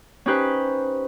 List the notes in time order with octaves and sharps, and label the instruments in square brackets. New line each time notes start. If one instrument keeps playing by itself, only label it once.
[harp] C#4 D#4 G4 B4 C5